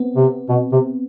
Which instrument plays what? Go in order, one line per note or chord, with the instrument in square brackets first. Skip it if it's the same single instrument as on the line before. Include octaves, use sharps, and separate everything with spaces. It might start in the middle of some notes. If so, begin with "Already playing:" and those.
Already playing: [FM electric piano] B3 C4
[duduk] C3
B2
C3